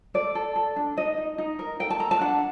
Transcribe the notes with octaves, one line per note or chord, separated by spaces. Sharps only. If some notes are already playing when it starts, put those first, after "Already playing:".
A4 D5
A4
A4
D4
D#4 D#5
D#4
D#4
A#4
A4 G5
A5
A4 A#5
A5
D4 F#5